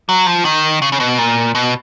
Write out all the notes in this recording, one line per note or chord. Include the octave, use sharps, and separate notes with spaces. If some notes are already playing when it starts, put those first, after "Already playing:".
F#3
F3
D#3
C#3
C#3
B2
A#2
B2